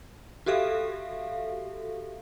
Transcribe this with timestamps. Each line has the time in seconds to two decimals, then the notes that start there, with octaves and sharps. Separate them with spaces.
0.46 F#4 G4 A4 E5 F5